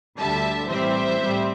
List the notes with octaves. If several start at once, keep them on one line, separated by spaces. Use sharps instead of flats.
D2 D3 G3 E5 A5
A2 E3 G3 C4 C5 E5
A2 G3 C4